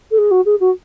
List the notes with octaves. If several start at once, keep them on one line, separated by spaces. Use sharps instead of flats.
A4
G#4
F#4
G#4
F#4